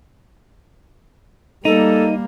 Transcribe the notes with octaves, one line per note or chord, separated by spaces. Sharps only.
G3 A#3 D#4 A4